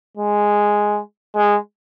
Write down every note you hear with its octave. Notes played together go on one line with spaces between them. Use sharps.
G#3
G#3